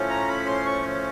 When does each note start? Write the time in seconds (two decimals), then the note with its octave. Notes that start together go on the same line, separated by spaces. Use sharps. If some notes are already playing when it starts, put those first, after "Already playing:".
Already playing: A2 F3 A3 C#4
0.10 A#5
0.28 B5
0.47 C6
0.66 C#6